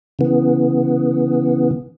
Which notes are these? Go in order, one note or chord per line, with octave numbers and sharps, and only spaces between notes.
C#3 E3 B3